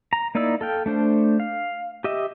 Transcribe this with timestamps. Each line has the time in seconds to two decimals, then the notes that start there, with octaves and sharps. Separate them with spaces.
0.13 A#5
0.35 A#3 D#4 E4 D5 E6
0.61 A4 F5 G5
0.86 A3 D4 C5
1.40 F5
2.04 G4 D#5 E5